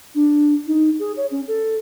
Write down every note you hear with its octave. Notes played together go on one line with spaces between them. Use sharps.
D4
D#4
G#4
C#5
C#4
A4